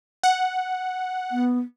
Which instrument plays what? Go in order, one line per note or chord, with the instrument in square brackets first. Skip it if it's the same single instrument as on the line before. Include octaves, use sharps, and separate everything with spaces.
[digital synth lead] F#5
[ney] B3